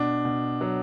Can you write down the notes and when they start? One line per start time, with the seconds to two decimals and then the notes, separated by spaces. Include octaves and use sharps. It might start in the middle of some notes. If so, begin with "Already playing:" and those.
Already playing: B2 D4
0.25 B2
0.61 F#3